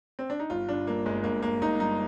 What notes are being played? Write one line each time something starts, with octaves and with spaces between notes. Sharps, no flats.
C4
D4
D#4
G1 F4
G2 D4
G2 A#3
G1 G#3
G1 A#3
G1 A#3
G1 D#4
G2 D#4